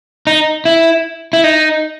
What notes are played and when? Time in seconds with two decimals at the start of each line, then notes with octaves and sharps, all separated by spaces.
0.27 D#4
0.65 E4
1.33 E4
1.44 D#4